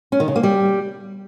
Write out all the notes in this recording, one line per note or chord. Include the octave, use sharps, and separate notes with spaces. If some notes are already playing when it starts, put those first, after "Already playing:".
C#4
D#3
C#3
A#3
G3